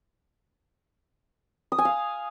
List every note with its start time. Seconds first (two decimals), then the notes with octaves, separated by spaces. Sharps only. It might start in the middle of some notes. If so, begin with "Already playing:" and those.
1.72 D#6
1.78 G#5
1.85 F5